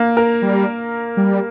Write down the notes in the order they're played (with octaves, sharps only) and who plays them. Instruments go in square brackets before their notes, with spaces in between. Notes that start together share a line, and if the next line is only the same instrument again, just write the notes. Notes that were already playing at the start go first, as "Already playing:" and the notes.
Already playing: [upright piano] A#3
A#4
[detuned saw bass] G3
G3